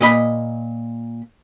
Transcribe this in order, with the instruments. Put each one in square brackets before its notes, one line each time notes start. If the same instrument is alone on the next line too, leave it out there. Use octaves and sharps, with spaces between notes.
[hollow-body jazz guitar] A#2 D#5 B5